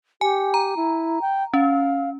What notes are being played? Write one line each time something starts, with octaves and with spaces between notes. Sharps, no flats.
G4 G#5
A#5
E4
G5
C#4 F5